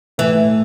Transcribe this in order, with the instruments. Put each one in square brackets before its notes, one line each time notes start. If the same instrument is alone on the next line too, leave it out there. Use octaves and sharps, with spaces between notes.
[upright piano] A2 A3 [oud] E3